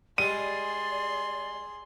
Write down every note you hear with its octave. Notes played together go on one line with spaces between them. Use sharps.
G3 G#3 G#4 D5 C6 D#7